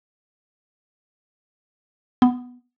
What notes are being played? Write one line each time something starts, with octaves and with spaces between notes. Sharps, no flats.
B3